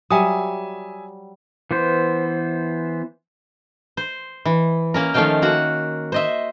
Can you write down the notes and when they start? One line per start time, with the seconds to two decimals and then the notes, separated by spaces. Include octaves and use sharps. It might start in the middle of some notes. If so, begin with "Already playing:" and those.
0.11 F#3 G3 E5 G#5 D#6
1.71 E3 B3 C5
3.97 C5
4.45 E3
4.94 A#3 C#4 A#4
5.14 D#3 F3 A3 C#4 F5 G5
5.42 A#3 F#4 F#5
6.12 C5 D#5 E5